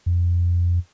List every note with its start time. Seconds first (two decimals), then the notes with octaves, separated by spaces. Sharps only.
0.06 F2